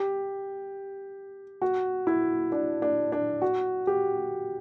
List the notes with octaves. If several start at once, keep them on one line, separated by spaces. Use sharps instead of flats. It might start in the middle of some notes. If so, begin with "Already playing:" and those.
Already playing: G4
F#4
E4
D4
D4
D4
F#4
G4